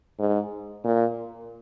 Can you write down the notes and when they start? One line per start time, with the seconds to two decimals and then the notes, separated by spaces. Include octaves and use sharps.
0.19 G#2
0.85 A#2